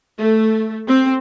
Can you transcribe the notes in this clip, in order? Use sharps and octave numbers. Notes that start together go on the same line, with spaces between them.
A3
C4